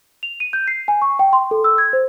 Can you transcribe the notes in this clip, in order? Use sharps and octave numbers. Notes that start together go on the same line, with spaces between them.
F7
D#7
G6
C7
G#5
C#6
G5
C6
A4
E6
G#6
C5